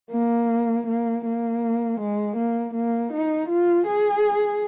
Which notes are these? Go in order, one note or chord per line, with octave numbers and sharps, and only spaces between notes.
A#3
A#3
A#3
G#3
A#3
A#3
D#4
F4
G#4